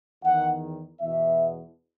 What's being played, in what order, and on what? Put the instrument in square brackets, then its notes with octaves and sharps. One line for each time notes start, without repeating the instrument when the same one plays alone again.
[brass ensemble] E2 D#3 F#5
E2 B2 E5